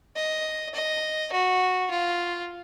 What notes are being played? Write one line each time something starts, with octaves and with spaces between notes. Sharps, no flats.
D#5
D#5
F#4
F4